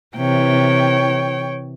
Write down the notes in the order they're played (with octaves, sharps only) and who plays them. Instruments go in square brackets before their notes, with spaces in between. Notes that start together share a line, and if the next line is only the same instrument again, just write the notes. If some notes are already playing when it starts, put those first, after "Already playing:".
[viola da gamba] C3 E3 [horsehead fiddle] C#5 G5